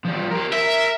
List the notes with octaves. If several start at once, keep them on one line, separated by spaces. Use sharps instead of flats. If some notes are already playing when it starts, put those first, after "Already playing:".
F3 G3
G4 A#4
A#4 E5